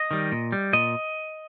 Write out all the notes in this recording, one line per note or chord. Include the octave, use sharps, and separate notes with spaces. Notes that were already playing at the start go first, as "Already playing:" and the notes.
Already playing: D#5
D#3 G3
A#2
G3
A#2 D#5